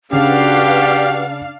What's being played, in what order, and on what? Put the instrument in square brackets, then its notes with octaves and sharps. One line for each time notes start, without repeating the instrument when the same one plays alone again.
[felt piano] C#3 [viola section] D4 F5 [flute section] F#4 B4 F#5 [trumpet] G4